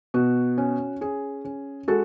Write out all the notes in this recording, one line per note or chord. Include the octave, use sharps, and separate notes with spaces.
B2 F#4
C#4
C#4 G#4
C#4
G#3 F#4 A4